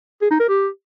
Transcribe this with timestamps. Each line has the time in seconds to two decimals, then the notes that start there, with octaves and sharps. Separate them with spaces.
0.22 G#4
0.31 D#4
0.40 A#4
0.49 G4